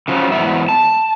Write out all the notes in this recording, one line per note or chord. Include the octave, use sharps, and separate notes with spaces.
C#3 F3 F#3
E2 G#2 A3 B3 E4 E5
A5